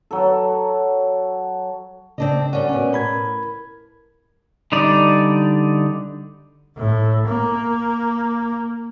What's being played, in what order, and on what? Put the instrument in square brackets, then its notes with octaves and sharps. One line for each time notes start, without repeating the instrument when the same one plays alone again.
[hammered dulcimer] F#3 A4
[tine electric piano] C#3 [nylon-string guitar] C4 D4 D#5
[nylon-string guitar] G3 C#4 [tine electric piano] A#4 D5 F#5
[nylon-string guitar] B2 C#4
[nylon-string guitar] A2 [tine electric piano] A#4 B5 G#6
[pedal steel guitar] D3 G3 D#4 D5
[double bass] A2
A#3